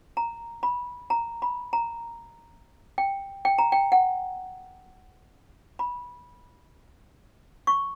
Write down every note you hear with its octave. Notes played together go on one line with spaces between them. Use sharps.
A#5
B5
A#5
B5
A#5
G5
G5
A#5
G5
F#5
B5
C#6